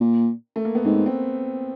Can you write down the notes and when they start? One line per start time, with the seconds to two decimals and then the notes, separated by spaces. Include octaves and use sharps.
0.01 A#2
0.56 A3
0.65 A#3
0.75 B3
0.85 G#2 C4
1.06 C4